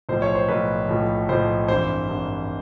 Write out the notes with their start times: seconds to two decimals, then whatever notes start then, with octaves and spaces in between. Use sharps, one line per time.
0.09 B1 A2 F3 C5
0.22 C#5
0.35 C5
0.48 B1 A2 F3 B4
0.89 B1 A2 F3
1.29 B1 A2 F3 C5
1.68 G#1 G2 E3 C5
2.08 G#1 G2 E3